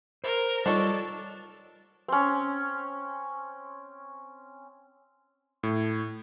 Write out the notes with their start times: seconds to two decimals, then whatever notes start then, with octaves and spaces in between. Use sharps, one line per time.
0.24 A#4 C5
0.66 G3 D4 D#4 F4 A4 C#5
2.08 C4 C#4
5.63 A2